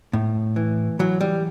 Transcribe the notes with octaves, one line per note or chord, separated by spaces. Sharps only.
A2
E3
E3 F#3
G3